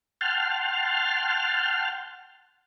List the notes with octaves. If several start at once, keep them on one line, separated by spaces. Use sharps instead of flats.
F#5 G5 A5 C6 F6